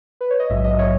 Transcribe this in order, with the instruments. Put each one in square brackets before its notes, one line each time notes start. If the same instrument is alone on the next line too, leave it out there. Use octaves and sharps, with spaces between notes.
[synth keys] B4
C#5
D#5
A#1 G#2 F#3 E5
D#5
C#5